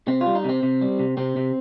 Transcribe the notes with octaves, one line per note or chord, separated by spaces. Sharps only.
C3 C4
F4
G3
D#4
C3 C4
C3
G3
C3
C3 C4
C3